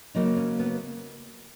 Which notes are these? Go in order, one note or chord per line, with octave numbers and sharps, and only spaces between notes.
C#3 F#3 A#3 D#4
C#4
B3